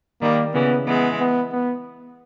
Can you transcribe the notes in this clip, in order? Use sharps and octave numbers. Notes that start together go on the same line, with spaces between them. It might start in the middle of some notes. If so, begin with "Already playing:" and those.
D#3 G3 A#3
C#3 E3 B3
E3 G#3 B3
B3
B3